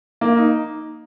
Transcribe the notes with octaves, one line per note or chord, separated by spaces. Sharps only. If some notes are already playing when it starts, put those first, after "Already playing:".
A#3
D#4